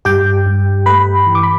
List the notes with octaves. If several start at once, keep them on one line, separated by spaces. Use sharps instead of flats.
G2 G4 G5
G2
A3 B4 B5
E3
D6
B5